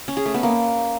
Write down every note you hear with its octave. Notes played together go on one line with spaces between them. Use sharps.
C#4
G#4
A3
B3
A#3